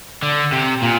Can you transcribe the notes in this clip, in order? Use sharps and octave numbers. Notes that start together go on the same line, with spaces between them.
D3
C3
A#2